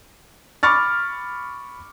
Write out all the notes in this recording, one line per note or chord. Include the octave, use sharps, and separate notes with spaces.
B5 C#6 D6 F6 A6